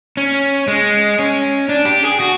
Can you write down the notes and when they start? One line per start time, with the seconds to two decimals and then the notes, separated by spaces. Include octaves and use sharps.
0.17 C#4
0.68 G#3
1.19 C#4
1.69 D4
1.85 G4
2.03 G#4
2.20 F#4